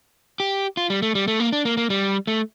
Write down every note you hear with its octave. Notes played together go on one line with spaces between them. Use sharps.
G4
F4
G3
A3
G3
A3
A#3
D4
A#3
A#3
G3
A3